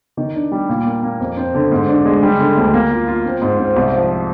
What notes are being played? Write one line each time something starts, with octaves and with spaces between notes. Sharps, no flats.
D#3
D4
G3
A#2
A#3
A#3
F2
C4
D3
G#2
D4
G#3
G3
D3
D2
A#3
F4
F4
C4
G#2
C4
C2
F3